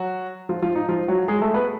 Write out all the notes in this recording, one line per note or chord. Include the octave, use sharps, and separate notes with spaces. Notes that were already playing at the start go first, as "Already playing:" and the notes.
Already playing: F#3 F#4
F3 F4
F3 F4
D#4
F3 F4
F#3 F#4
G#3 G#4
A3 A4
B3 B4